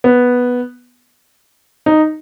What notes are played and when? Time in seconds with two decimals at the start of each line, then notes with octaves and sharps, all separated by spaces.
0.04 B3
1.86 D#4